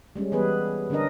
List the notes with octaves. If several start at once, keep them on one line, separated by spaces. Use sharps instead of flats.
G3 G#3 C#4
E3 G3 B3 G#4 B4
D3 C#4 D4 A#4 D#5